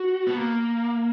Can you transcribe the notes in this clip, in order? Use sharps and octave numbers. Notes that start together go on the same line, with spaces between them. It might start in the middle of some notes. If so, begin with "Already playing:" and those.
Already playing: F#4
B3
A#3